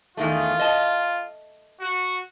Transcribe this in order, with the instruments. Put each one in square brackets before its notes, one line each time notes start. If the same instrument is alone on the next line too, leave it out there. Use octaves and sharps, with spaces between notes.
[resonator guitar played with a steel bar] E2 D#3 A3 [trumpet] F4
[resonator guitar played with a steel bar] D#5 A5
[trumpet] F#4